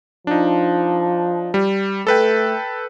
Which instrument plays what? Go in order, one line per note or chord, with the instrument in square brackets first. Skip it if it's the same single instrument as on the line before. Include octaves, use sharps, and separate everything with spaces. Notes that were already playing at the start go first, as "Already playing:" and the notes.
[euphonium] F3 [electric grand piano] D4 D#4
[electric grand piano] G3
[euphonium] A3 [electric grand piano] A4 B4 G5